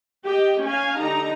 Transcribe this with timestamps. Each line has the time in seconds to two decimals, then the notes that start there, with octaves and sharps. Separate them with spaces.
0.25 G4 D#5 G5
0.63 C#4 F5 G#5
0.98 D3 D#4 G4 A#5